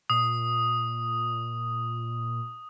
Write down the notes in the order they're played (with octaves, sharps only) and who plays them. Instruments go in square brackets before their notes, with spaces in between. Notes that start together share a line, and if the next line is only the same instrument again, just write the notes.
[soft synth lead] A#2 [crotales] D#6